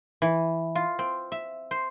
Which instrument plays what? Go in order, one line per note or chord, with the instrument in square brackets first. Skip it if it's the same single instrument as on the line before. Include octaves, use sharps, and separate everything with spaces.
[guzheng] E3
F4
C4
E5
C5